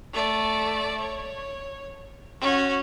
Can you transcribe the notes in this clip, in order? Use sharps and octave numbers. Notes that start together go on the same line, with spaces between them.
A3 D5
C#5
C#4 F#4